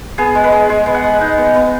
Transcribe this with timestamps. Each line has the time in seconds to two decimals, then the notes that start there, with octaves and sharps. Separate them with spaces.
0.18 B3 G#4
0.35 G#3
0.44 B4
0.52 G#3
0.69 G#3 G#4
0.86 B3
0.95 F#5
1.04 G#3
1.21 D#4
1.38 B3
1.55 B3